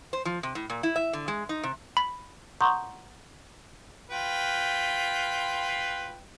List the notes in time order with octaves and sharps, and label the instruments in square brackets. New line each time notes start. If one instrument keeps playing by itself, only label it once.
[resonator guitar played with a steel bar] C5
F3
C3
A2
A#2
E4
E5
D3
G#3
D#4
C3
[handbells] B5
[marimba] F#5 A#5 C6 C#6 D#6 G6
[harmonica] F4 B4 G5